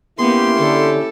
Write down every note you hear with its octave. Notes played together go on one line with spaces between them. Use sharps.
A#3 B3 C#4 E4 G4 C6
D3 A4